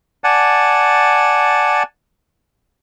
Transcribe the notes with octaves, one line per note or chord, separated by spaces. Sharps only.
D5 F#5 G#5 A5